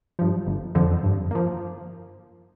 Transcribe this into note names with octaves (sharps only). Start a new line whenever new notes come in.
G2 F3
G1
F2 D3 F3
G2
F3 A#3